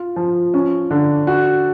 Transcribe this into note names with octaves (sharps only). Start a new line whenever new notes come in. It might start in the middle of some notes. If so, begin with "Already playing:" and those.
Already playing: F4
F3
C#4
D3
F#4